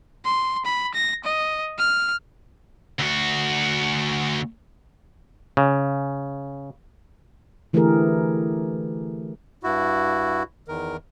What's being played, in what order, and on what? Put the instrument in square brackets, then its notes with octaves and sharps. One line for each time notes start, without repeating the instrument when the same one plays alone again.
[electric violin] C6
B5
A#6
D#5
F6
[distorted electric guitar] D2 F#4
[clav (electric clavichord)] C#3
[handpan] D3 E3 A3 G4 G#4 A#4
[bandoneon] G2 E4 F#4
E2 D#3 A#4